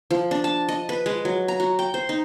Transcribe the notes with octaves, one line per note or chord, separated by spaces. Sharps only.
F3
D4
A5
D#5
B4
G#3
F#3
A#5
F#4
G5
C5
D#4